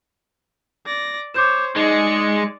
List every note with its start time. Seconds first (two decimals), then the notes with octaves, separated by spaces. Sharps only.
0.86 D5 A#6
1.34 C5 C#5 D6 G6 E7
1.76 G#3 D#4 D5 C#7